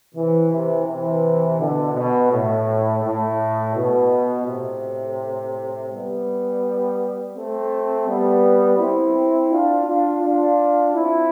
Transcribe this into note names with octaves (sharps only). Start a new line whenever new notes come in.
C3 E3
C3 E3
C3 E3
B2 D3
B2
A2
A2
B2
A2 C3
G3 B3
A3 C4
G3 B3
C4 E4
D4 F4
D4 F4
D4 F4
C4 E4